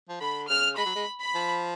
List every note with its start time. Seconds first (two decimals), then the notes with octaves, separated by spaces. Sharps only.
0.09 F3
0.20 D3 B5
0.48 C#3 F6
0.77 G#3 B5
0.86 F#3
0.95 G#3
1.21 B5
1.35 F3